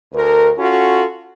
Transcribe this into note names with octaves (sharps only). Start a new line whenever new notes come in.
D2 A#4
C#4 F4 F#4 A4